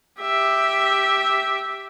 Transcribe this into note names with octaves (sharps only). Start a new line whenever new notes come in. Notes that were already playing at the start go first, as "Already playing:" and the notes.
G4 E5